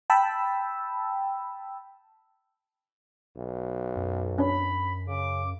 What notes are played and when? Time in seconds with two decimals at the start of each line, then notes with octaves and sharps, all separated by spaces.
0.10 G5 A5 B5 E6
3.37 B1
3.97 F#2
4.38 C#4 D4 C#5 B5
5.07 C#3 D6